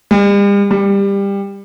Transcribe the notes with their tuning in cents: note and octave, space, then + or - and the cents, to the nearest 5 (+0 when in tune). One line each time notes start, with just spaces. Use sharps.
G3 +45
G3 +20